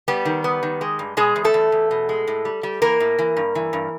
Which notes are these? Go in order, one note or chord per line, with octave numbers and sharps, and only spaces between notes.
G3 B3 G4
D#3
B3
D#3
G#3
G2
B2 G#3 G#4
E2
A3 A4
E2
E2
B2
G#3
A2
G3
G3
E3 A#3 A#4
A2
E3
G2
E3
G2